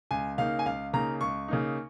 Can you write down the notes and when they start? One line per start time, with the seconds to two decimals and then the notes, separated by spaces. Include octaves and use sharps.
0.11 C#2 G#5
0.38 C#3 A#3 D#4 F5
0.59 G#5
0.66 C#2 F5
0.93 C#3 A#3 D#4 A#5
1.21 C#2 C#6
1.48 C#3 A#3 D#4